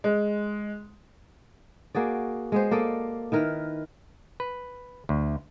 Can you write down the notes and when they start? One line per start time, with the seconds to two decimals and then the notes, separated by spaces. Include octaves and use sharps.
0.04 G#3
1.95 A#3 F#4 G#4 D5
2.52 G#3 B3 C5
2.71 A#3 A4 D5 D#5
3.32 D#3 E4 A#4 B4
4.40 B4
5.09 D2